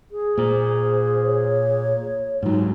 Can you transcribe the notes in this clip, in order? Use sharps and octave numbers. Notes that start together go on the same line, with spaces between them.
G#4
A#2 C5
C#5
G#2 F#3 D#4 F4